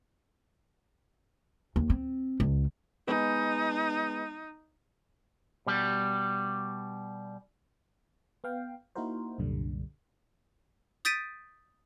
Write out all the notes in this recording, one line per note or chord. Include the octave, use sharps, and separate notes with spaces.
D#2
C4
C#2
G#3 B3 D#4
B2 G3
B3 F5 G5
A#3 D#4 E4 F#4 A#4 C5
C2 F#2 A#2 D3 G3
D#6 G6 A6 B6 D7 D#7